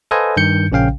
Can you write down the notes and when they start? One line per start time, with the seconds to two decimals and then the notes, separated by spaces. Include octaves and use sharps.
0.11 A4 B4 C5 D#5 F5 G#5
0.37 G2 D#3 G6 C#7
0.72 A#1 C#3 C#4 F5 G5